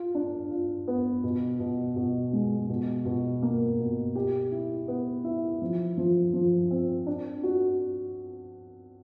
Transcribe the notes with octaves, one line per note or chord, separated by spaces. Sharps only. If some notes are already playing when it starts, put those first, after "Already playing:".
Already playing: F4
D4
F4
B3
B2
B2
B2
G#3
B2
B2
A#3
B2
G4
E4
B3
E4
F3
F3
F3
C4
D4
F#4